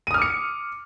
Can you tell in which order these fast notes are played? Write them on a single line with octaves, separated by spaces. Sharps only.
D#7 D#6 F6 D6 C#7